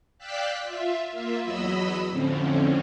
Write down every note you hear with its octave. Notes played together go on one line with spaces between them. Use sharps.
D5 F5 G5 E6 F#6 B6
F4 E5
A#3 F4 E5
E2 F#3 D#5 B5 E6
F2 A2 D3 C4 C#4